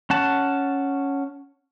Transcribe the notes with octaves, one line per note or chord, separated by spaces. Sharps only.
C#4 F#5 A5